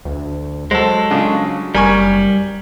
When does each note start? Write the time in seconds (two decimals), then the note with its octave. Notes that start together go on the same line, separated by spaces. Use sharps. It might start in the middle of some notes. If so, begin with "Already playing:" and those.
0.05 D2
0.71 F#3 G#3 A4 C5
1.11 C#3 D4 F4
1.75 F#1 G3 A#4 G#5 C#6